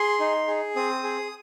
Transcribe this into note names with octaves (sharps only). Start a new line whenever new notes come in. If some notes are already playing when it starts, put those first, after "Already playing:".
Already playing: G#4 C6
D#4
G#4
C4 D#6
G#4